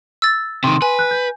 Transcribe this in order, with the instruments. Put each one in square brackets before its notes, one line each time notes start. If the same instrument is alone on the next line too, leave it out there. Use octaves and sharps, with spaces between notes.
[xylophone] E6 A6
[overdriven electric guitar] C3 D#3 [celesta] C6
[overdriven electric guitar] B4 [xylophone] G#5
[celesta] F#6
G6